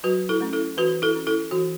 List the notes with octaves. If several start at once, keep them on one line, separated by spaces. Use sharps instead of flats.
F#3 F#4 B4
E4 A4
A3 C#4
E4 A4
E3 F#4 B4
E4 A4
C#4
E4 A4
E3 F#4